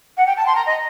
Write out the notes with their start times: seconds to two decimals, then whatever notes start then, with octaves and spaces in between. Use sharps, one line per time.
0.17 F#5
0.26 G5
0.37 A5
0.46 C6
0.55 A#5
0.66 D#5